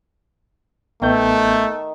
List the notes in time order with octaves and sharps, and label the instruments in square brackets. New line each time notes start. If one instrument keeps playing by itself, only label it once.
[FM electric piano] A1 B3 G6 [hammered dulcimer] D#3 [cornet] A3